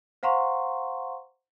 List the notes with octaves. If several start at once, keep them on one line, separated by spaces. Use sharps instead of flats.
C5 F5 F#5 A#5 C6 C#6